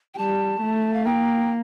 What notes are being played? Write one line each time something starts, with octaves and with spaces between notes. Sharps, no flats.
G5
G3 A5
A3
F5
A#3 G5